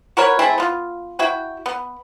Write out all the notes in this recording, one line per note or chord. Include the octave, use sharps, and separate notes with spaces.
F#4 A#4 B4 C#5
G#3 A3 C4 E4
B3 F4
E4 F#4 G5
B3